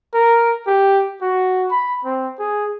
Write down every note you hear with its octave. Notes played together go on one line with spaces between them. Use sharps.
A#4
G4
F#4
B5
C4
G#4